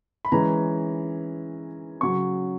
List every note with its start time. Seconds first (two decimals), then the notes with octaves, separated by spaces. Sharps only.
0.25 B5
0.32 E3 G#3 C#4 A#5
2.01 C#3 F#3 C#4 C#6